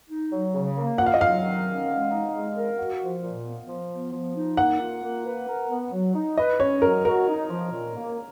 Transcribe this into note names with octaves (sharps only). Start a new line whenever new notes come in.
D#4
F#3
C#3
A#3
F4 F#5
F5
D#5
F#3 F5
D#3
C#4
G#3
D#4
G#3
A#4
F#4
F3
A#2
B3
F3
B3
F3
D#4
A#3 F#5
F4
A#3
B4
A#4
B3
F#3
D#4
B4 D#5
C#4 C#5
F#3 A#4
F#4 A#4
D#4
F3
A#2
A#3